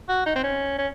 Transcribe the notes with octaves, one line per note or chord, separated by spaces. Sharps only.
F#4
D#4
C4
C#4
C#4